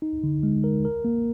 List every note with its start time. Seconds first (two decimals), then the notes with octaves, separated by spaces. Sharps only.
0.02 D#4
0.23 D3
0.43 G#3
0.64 A#4
0.85 A#4
1.05 A#3